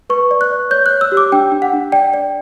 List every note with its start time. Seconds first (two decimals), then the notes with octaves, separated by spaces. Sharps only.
0.10 B4 C#6
0.31 D5
0.41 F#6
0.51 D5
0.71 C#5 G6
0.86 C#5 F#6
1.01 E6
1.12 G4
1.17 D6
1.32 D4 G5
1.52 D4
1.62 F#5
1.73 D4
1.92 D5 G5
2.14 D5